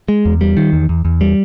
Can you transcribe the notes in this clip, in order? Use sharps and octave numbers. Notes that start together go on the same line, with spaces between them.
G#3
E2
G3
D#3
E2
E2
E2
G3